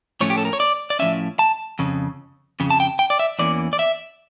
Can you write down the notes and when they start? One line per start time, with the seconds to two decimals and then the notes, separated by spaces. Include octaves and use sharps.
0.21 A2 F3 A3 C#4 C#5
0.30 G4
0.38 A4
0.45 A#4
0.53 C#5
0.60 D5
0.90 D5
0.99 A2 F3 A3 C#4 E5
1.39 A5
1.79 F2 C#3
2.60 F2 C#3
2.70 A5
2.80 G5
2.99 G5
3.10 D5
3.19 E5
3.39 E2 E3 A#3 C#4 D5
3.73 D5
3.79 E5